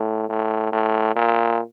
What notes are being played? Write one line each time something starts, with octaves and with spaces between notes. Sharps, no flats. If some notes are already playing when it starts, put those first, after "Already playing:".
Already playing: A2
A2
A2
A#2